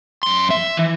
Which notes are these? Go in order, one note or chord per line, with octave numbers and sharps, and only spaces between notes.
F#2 C6
E5
E3